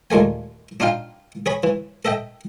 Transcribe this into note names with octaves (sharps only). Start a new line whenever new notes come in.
D#2 A#2 G#3 A3 G#5
D4 D#4 F4 F5 G5
G#4 C#5 B5
E3
A4 D#5 E5 G5